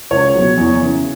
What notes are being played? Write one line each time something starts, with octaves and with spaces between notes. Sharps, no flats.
C#2 C#5
B2 F#3
E2
C#3 E3